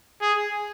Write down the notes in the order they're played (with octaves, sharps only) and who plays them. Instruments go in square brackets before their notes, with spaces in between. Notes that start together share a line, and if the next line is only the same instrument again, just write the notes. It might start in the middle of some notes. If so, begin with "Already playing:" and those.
[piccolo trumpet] G#4